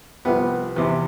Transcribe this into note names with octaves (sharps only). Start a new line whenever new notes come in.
C2 C3 F3 B3
E2 C3 E3